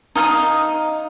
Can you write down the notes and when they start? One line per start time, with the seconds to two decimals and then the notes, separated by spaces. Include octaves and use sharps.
0.16 D#4 F5 G#5 D#6